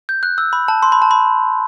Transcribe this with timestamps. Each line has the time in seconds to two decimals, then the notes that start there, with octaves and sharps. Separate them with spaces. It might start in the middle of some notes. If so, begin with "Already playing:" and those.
0.09 G6
0.23 F#6
0.38 E6
0.53 B5
0.68 A5
0.82 C6
0.92 B5
1.02 A5
1.11 B5